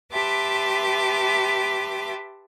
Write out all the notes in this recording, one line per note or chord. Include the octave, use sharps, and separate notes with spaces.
G4 B4 E5 A5 C6 D6